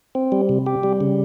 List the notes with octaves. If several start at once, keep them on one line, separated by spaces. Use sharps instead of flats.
C4
G3
C3
G4
G3
C#3